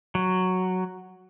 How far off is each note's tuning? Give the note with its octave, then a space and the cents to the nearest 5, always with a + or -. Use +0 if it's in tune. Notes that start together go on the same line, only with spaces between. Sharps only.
F#3 +0